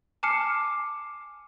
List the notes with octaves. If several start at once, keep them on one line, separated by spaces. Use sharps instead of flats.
G#5 A5 D6 F6 C7 C#7